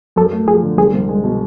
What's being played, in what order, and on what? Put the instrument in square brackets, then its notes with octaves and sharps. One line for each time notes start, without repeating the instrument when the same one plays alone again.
[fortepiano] F#2 [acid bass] A4
[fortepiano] A3
[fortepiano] F3 [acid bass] G#4
[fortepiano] D3
[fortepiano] C2 [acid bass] G#4
[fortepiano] C2
G#3
B2